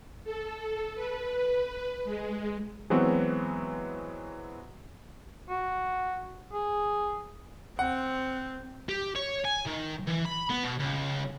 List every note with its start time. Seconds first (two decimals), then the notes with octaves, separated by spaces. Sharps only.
0.24 A4
0.95 B4
2.05 G#3
2.90 E3 F#3 G#3 B3 C4 F#4
5.49 F#4
6.53 G#4
7.79 C4 F#5
8.89 G4
9.16 C#5
9.45 G#5
9.67 D#3
10.07 E3
10.25 B5
10.50 B3
10.64 B2
10.79 C#2